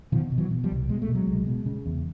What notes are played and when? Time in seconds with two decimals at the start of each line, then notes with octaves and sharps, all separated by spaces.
0.12 B2 D#3 F3
0.32 B2
0.38 E3 F#3
0.51 B2
0.64 F3 G3
0.71 C2
0.89 B2 G#3
1.02 A3
1.08 B2
1.15 F#3 G#3
1.27 C2
1.47 B2
1.66 C#3
1.86 E2